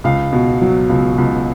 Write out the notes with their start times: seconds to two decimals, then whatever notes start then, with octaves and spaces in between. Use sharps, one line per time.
0.04 C#2 F5
0.33 B2
0.61 F#3
0.89 C#2
1.18 C#2